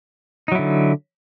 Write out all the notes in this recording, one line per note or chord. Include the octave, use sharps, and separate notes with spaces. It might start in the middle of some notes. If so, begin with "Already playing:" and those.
D3 F#3 D#4 E4